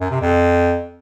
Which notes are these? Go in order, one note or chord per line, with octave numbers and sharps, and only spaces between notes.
F#2
C3
F2